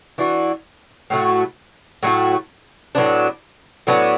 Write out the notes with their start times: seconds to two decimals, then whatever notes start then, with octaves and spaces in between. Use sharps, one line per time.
0.18 E3 D4 F#4
1.10 A2 F#3 A3 F#4
2.03 A2 F#3 A3 F#4
2.95 A2 F#3 B3 D4
3.87 A2 F#3 B3 D4